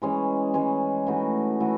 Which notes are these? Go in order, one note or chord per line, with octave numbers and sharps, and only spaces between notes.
E3 G#3 C#4
E3 G#3 C#4
E3 A3 D#4 F#4
E3 A3 D#4 F#4